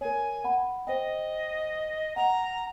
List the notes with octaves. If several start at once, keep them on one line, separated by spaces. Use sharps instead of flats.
A#4 C#5 G#5
F#5 B5
C5 D#5 G5
F#5 A#5 F7